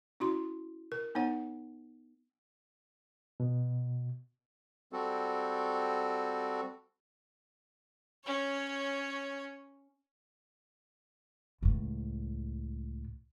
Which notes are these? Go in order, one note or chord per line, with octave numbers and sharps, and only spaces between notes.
C#4 E4 F#4 C6
A#4
B3 D#4 C#5 F#5
B2
G3 C4 F#4 A4
C#4 C#5
C#2 A2